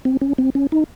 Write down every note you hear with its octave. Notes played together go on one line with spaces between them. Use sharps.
C4
C#4
C4
C#4
D#4